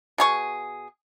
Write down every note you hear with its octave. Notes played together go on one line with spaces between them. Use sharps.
B2 G#4 C#6